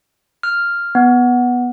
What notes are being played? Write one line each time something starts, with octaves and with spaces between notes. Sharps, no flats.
F6
B3